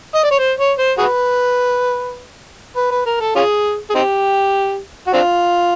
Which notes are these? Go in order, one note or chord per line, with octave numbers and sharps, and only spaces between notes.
D#5
D5
C#5
C5
C#5
C5
F#4 G#4 B4
B4
B4
A#4
A4
C#4 F4 G#4
G#4
C4 D#4 G4
F#4
C4 D4 F4